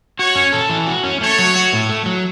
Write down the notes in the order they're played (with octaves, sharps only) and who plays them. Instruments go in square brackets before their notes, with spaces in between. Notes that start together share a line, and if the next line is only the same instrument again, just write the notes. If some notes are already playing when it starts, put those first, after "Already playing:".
[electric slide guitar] F#4 [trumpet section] C#5
[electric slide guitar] C#4
A4
E3
F#4
C#4
[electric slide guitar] A3 [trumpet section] C#5
[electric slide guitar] F#3
F#4
A2
A3
F#3